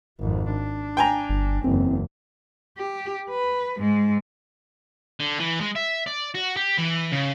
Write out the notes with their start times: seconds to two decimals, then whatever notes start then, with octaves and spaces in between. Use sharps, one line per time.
0.19 G#1 F2
0.50 D4
0.97 G5 G#5 A#5
1.29 G1
1.64 F#1 E2 C4
2.77 G4
3.30 B4
3.78 G#2 G#3
5.20 D3
5.40 E3
5.61 G#3
5.75 E5
6.06 D5
6.34 F#4
6.57 G4
6.78 E3
7.12 C#3